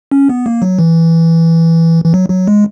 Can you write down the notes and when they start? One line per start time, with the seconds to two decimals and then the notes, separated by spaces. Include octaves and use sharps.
0.11 C#4
0.29 B3
0.46 A#3
0.62 F#3
0.79 E3
2.04 E3
2.14 F#3
2.30 F#3
2.47 G#3